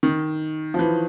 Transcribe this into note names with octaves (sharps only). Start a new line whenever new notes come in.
D#3
F3
E3